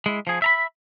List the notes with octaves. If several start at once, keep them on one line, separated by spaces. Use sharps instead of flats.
G#3 E4
F3 G#4
E5 A#5 B5